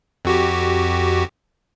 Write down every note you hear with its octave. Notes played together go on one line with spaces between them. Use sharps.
F2 F#4 G4